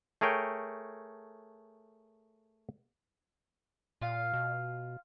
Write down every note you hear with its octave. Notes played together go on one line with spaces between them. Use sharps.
A3 G#4 A#4 C#5 G5
A#2 F4 F5
B2